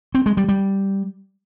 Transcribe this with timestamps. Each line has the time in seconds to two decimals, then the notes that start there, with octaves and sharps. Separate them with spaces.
0.15 C4
0.26 G#3
0.37 G3
0.49 G3